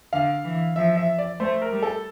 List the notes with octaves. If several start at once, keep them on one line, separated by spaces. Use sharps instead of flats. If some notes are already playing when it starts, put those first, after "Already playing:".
D3 F5
E3
F3 E5
E5
D5
A3 C5
A#4
G3
A4